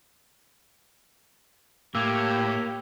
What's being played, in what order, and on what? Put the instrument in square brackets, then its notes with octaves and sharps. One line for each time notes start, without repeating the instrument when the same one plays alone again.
[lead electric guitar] A2 [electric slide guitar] A#3 [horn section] G4 [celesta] E6 G#6